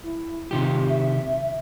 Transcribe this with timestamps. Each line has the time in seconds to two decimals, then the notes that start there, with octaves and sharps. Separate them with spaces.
0.03 E4
0.51 C3 D#3 F4 G4
0.88 E5